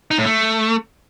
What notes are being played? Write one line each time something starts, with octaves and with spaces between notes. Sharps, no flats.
D#4
A2
A3